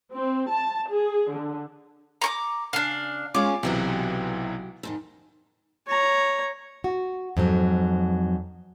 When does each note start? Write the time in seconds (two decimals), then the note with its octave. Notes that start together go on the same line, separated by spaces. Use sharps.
0.12 C4
0.51 A5
0.90 G#4
1.33 D3
2.22 A#5 C#6 D6
2.73 C#3 D4 F5
3.35 G#3 C#4 F4 C#5 F5 D6
3.63 B1 C3 E3 F#3 F#4 G4
4.83 F2 G#2 D#3
5.87 C#5 A#5
6.84 F#4
7.37 F2 G#2 F#3